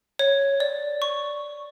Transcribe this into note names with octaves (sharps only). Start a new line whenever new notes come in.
C#5
D5
C#6